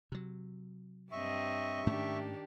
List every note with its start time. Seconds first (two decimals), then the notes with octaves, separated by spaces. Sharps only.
0.12 C3 F#3
1.12 G2 C4 D#5 E5 C#6
1.87 G#2 D#3 A3 C#4 D4 G4